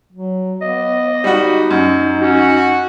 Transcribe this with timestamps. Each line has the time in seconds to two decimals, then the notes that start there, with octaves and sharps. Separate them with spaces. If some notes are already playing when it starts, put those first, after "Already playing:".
0.12 F#3
0.61 B3 D#5
1.24 G3 D#4 F#4
1.71 F#2
2.22 C#4 F#4